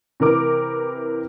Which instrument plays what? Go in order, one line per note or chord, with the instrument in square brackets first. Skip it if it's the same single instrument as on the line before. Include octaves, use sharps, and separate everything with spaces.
[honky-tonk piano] C3 E3 A#4 D6